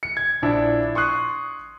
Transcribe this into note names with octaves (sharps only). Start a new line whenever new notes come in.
C#7
G#6
A#1 D4 E4
C6 C#6 D#6 F#6 C7